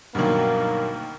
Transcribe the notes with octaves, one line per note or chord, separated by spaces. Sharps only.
D2 G2 B2 D#3 F#3 A#3